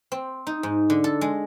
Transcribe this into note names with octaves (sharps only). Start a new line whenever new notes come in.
C4
D#4
G#2
D3
A4
G#3